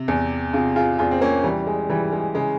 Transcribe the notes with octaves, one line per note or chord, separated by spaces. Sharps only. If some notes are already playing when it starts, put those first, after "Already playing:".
Already playing: C3
E2
C3 F4 G#4
F4 G#4
E2 F4 G#4
C4
A#3 C#4
E3 G3
G#3
E3 G3
G#3
C#3 G#3